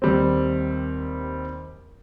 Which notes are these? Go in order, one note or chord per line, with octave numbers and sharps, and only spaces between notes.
D#2 G3 C4